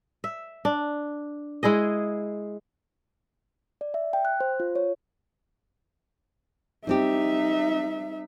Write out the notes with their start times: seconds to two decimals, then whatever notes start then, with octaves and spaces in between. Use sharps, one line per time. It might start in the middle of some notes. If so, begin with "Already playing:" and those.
0.24 E5
0.65 D4
1.63 G#3 E4 G#4 D#5
3.81 D5
3.94 E5
4.13 G5
4.25 F#6
4.40 C5
4.60 F4
4.75 C#5
6.87 G3 C4 D#4 G4 E5